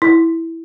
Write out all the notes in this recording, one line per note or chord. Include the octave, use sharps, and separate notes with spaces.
E4